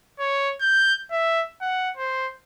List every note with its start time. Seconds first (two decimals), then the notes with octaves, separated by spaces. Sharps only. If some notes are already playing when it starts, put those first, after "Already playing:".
0.19 C#5
0.61 G6
1.12 E5
1.61 F#5
1.97 C5